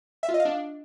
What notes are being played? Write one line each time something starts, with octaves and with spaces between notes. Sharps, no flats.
E5
F4
D#5
F5
D4